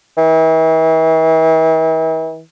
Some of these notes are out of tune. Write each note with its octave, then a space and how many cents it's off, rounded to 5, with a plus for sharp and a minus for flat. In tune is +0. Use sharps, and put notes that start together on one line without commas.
E3 -40